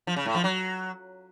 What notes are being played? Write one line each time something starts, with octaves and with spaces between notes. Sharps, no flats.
F3
C#3
A2
F3
F#3